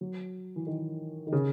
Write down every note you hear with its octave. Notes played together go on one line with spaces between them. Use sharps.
F#3
E3
D#3
D#3
C#3